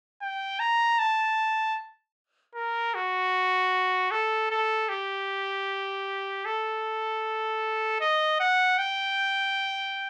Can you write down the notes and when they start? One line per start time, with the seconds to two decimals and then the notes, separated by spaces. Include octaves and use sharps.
0.22 G5
0.60 A#5
0.99 A5
2.55 A#4
2.95 F#4
4.11 A4
4.51 A4
4.89 G4
6.45 A4
8.01 D#5
8.40 F#5
8.78 G5